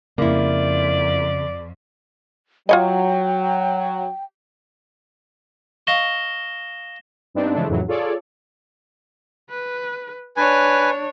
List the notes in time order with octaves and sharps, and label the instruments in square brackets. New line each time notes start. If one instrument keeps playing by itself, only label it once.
[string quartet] F2 [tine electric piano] C#3 [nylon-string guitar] A#3 E4 [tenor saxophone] D5
[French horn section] F#3 [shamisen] F4 C#5 D#5 [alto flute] G5
[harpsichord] D#5 F5 C#6 [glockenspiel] A#6 E7 G7
[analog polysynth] G2 B3 C4 D4 D#4
C#3 E3 F3 G#3 A3 D4
F2 A2 C#3 E3 F#3
F4 G#4 A4 C#5 D5
[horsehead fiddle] B4
[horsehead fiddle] D4 C#5 [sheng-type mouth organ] B4 G#5